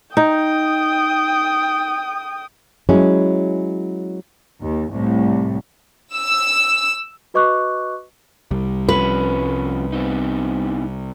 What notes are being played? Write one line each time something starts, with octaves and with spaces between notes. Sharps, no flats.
D#4 G5 D#6
F#3 G#3 C#4 E4
D#2
C2 A2
E6
F#4 B4 D#5 C#6 D6 F#6
C2 G3
F3 C#4 B4
B3 C4 D#4